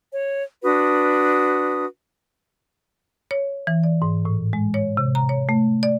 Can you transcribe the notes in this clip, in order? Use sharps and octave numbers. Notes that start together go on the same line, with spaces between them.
C#5
D4 F#4 B4 D#6
C#5
E3
D5
G#2
A2
G#3
C#5
C3
A#5
C#5
A3
D5